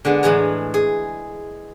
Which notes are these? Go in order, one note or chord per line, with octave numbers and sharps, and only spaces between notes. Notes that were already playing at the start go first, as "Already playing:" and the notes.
D3 G#3 B3
A2 E3 G#3 G#4 A#5
G#4